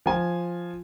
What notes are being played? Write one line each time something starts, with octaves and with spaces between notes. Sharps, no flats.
F3 G#5